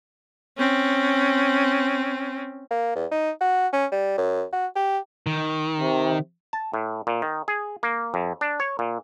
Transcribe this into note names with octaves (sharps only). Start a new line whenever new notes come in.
C4 C#4
A#3
E2
D#4
F#4
C#4
G3
F#2
F#4
G4
D#3
C3
A5
A2
A#2
D#3
G#4
A#3
F2
D4
C#5
A#2